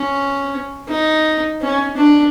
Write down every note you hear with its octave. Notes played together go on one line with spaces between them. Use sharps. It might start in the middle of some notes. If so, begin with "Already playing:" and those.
Already playing: C#4
D#4
C#4
D4